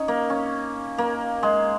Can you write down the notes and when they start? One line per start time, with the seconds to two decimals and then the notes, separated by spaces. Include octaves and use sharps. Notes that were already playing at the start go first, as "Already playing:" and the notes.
Already playing: C#4 D#4
0.08 A#3
0.30 C#4
0.98 A#3
1.43 G#3